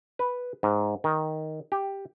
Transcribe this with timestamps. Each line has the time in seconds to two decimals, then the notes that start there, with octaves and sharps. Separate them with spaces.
0.19 B4
0.63 G#2
1.04 D#3
1.72 G4